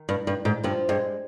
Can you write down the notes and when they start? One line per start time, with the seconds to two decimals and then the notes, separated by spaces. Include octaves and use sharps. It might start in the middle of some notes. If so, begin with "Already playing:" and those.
Already playing: D#3
0.09 G2
0.27 G2
0.45 G#2
0.64 G2 F3
0.89 G2 G#3